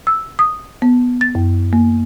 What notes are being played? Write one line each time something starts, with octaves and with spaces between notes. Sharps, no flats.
E6
D#6
B3
A6
F#2
A#3